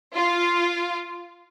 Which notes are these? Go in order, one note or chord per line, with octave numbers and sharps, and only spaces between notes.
F4 F5